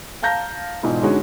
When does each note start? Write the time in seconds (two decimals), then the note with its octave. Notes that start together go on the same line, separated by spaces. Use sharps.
0.22 F5 A5 A#5 G6 A#6
0.83 E1 G#2 F4
1.02 D3 G#3 C#4 D#4 F#4 G#4